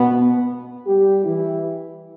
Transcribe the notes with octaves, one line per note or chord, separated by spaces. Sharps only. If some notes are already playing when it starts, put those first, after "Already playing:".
Already playing: B2 B3
G3 G4
E3 E4